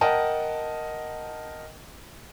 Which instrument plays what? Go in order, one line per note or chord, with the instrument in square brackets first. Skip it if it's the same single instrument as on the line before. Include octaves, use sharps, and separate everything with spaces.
[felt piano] A#4 D#5 F#5 G5 A5